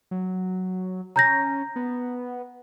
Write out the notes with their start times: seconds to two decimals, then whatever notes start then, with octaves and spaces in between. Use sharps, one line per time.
0.11 F#3
1.16 C#4 A#5 G6 A#6
1.76 B3